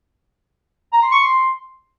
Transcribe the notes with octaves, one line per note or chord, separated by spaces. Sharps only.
A#5
C6
C#6
C6